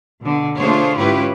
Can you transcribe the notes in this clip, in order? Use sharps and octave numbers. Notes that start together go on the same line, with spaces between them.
B2 D3
A3 D4 F4 G#4 C5 C#5
G#2 C#4 E4 F4 G4 B4